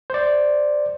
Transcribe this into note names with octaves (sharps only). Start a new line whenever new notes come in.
C5 D5